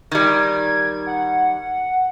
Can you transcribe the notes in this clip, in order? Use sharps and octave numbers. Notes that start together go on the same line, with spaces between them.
D#3 G3 G#6
F#5